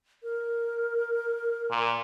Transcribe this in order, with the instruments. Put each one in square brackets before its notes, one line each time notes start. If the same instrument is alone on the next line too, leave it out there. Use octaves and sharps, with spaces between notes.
[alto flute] A#4
[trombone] A#2